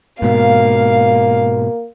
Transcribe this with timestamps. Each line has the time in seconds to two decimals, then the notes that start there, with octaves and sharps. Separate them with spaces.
0.22 G#2 B2 A#3 F5